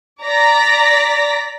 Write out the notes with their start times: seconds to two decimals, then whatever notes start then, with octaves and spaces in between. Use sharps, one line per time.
0.23 D5 A#5 A#6 B6